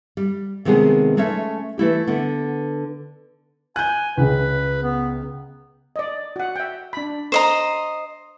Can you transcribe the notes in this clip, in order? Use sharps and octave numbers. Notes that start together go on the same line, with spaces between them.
G3
C3 D#3 F3 G#3 B3 G#4
G#3 A3 C#4 C#5 E5
E3 A3 E4 G4
D3 B3
G#5 F#6 G6
C#2 C#3 B4
B3
D5 D#5
F#4 F#5
E5 G5
D4 B5
C5 D#5 A#5 C6